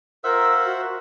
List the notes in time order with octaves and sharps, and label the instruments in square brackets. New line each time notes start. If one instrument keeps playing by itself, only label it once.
[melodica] F4 [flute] A#4 [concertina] C5 F#5 [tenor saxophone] E5
[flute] F#4